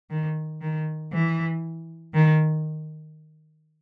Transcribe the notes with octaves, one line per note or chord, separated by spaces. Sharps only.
D#3
D#3
E3
D#3